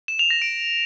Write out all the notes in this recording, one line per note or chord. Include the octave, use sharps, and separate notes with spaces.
E7
F7
A#6
D7